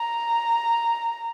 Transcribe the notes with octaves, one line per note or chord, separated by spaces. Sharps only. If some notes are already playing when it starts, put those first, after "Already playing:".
Already playing: A#5